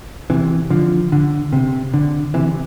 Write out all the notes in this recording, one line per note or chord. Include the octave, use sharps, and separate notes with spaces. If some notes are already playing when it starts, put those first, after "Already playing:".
C3 E3
D3 F3
D3
C3
D3
C3 E3